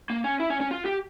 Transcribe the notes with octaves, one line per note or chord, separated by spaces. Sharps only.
A#3
C#4
E4
C#4
C#4
F4
G4